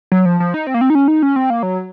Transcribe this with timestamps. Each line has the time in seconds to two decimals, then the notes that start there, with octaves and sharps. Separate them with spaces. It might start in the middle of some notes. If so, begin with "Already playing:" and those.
0.12 F#3
0.25 F3
0.40 F3
0.54 D#4
0.67 C4
0.74 A#3
0.81 C4
0.90 D#4
0.95 C#4
1.08 D#4
1.23 C#4
1.36 C4
1.50 A#3
1.63 F#3